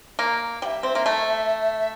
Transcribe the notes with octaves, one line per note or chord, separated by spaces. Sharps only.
A#3
G3 E5 G5
C4
A#3
A3